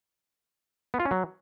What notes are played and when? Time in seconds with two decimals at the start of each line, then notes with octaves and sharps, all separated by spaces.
0.94 B3
1.00 F4
1.05 C#4
1.11 F#3